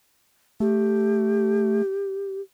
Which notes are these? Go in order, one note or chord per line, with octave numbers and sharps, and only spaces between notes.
A3 G4